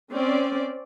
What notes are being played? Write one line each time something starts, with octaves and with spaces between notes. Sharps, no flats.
C4 C#4 D5